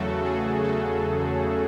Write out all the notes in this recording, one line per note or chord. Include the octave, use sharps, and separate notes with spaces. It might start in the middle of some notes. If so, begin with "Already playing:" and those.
Already playing: E2 C#3 F#3 A3 F#4 A4
G#4
F#4 A4